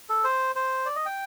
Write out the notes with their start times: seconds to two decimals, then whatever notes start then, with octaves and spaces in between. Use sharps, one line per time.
0.09 A4
0.24 C5
0.55 C5
0.86 D5
0.96 D#5
1.06 G5